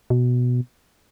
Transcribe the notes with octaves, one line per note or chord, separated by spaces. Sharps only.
B2